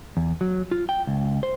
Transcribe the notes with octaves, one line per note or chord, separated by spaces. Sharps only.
E2
F#3
F4
G5
C#2
C5